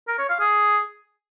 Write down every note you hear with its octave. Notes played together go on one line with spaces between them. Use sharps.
A#4
C#5
F5
G#4